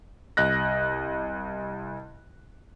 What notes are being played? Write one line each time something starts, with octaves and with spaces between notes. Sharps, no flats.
C2 D#5 F#6 A#6